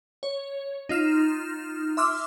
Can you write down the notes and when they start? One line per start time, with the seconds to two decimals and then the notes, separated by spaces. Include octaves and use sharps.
0.23 C#5
0.89 D#4 F4 F6 E7
1.97 E5 C6 D6 E6 F6